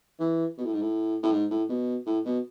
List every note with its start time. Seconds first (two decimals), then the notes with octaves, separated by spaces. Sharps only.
0.20 E3
0.57 B2
0.65 A2
0.73 G#2
0.81 A2
1.23 A2
1.32 G#2
1.50 A2
1.69 B2
2.06 A2
2.25 B2